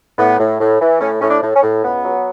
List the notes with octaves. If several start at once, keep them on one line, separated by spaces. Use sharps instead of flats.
A2 B3
A2
A2
E3
A2 C#4
A2 C#4
D4
A2
C#4
A2
C#2 B3
F#3